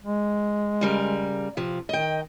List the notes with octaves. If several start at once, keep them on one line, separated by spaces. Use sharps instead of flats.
G#3
C#3 G3 A#4
C3 F3
D#3 D#5 G5